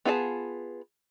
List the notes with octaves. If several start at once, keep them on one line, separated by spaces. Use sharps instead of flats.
B3 F4 G#4 B4 A5